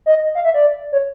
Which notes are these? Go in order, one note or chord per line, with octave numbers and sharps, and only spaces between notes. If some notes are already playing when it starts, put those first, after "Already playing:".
D#5
F5
E5
D5
C#5